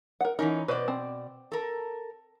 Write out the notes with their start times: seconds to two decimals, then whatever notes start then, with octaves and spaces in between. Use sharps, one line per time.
0.21 A#4 F#5
0.39 E3 C#4 D#4 A#4
0.68 B2 B4 C5 D5 D#5
0.88 C4
1.52 A4 A#4